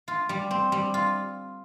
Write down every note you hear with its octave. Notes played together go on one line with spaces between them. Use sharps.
F4
G3
C4
G3
F4